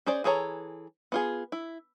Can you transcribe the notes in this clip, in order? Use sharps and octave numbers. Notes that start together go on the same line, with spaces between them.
C#4 G#4 C5 D5
E3 G#4 A4 C#5 A#5
B3 F4 G#4
E4